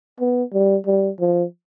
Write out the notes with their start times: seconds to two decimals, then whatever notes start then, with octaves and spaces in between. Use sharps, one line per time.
0.20 B3
0.53 G3
0.87 G3
1.20 F3